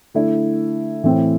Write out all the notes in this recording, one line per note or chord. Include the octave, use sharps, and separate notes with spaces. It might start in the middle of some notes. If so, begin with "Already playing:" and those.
D3 A3 E4
A2 E3 A3 C4